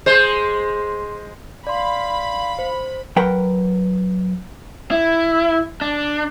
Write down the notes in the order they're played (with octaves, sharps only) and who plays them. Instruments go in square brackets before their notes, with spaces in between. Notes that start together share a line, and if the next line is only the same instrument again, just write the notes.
[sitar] G#3 C5
[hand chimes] D5 C6 [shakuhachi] F5 [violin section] B5
[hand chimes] C5
[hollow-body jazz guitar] F#3 A#4 B4 F#5 G5
[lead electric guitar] E4
D4